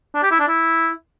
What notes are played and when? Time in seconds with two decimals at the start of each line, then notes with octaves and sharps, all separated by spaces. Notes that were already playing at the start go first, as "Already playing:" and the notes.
0.15 D4
0.23 G4
0.31 E4
0.40 D4
0.48 E4